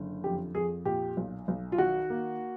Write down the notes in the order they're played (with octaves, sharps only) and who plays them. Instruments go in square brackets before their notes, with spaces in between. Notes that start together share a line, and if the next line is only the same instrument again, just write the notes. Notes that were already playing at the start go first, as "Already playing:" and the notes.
Already playing: [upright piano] F#1 D3
[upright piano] F2 [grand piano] G4
[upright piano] F2 [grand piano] G#4
[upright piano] A#2 [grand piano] G4
[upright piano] B1
B1
[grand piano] F4
[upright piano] D#3 [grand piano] F#4
[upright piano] A#3